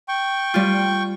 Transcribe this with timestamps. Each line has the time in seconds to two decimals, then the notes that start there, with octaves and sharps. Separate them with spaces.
0.08 G5 C#6
0.54 G3 F4